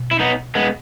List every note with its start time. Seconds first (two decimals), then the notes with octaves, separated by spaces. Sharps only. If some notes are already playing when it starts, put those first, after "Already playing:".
Already playing: B2
0.11 E4
0.20 B3 D#4
0.55 G#3 B3